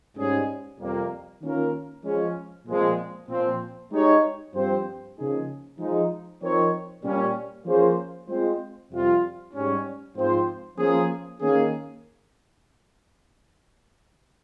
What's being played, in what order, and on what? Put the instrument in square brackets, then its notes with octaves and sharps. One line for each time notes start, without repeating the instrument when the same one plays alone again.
[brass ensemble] G#2 G3 C#4 G#4
F2 C3 G3 A#3
D#3 A#3 C#4 F4 A#4
F3 G#3 C#4
A#2 F3 G#3 C4
A#2 F3 C4
G#3 D#4 G4 C#5
G2 F3 C4 G4 C5
C#3 F3 A#3 D#4 G#4
F3 G#3 D#4
F3 C4 D#4 A#4 C#5
A#2 G3 C#4
F3 A#3 C#4 G#4 C5
G#3 C4 F4 C5
F2 C3 G3 C4 F4
G#2 G3 C#4
G#2 F3 C4 F4 C5
F3 A#3 C#4 G#4
D#3 A#3 C#4 G#4